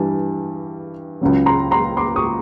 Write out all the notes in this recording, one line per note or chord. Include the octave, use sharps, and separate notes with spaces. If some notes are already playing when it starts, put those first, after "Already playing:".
Already playing: G2 E3 G3 A5
C#2 C#3 F#3
A#5 C6
A#5 C6
C6 D6
C#6 D#6